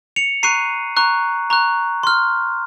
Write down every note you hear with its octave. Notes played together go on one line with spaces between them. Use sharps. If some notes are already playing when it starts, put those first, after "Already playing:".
C#7 F7
A#5 C#6 F#6 C7 D#7
A#5 C#6 F#6
A#5 C#6 F#6
C6 F6